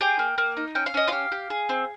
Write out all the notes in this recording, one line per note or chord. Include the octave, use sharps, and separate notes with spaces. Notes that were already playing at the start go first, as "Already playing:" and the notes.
G4 G#4 G5
A#3
A#3
D#4
C#4 G5
F5
C#4 D#5
F4 G4 F5
G4
G#4
C4